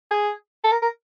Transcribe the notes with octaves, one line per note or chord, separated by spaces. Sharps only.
G#4
A4
A#4
A#4